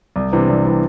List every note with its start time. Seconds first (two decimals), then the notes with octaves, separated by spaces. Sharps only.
0.16 C2
0.32 C3 E3 B3 D4
0.49 C2
0.64 C3 E3 B3 D4